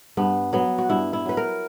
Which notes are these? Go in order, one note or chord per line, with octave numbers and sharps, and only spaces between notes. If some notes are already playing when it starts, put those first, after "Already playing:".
G2 B3
F#3 B3
F#4
G2 E4
E4
F#3 B4
A#4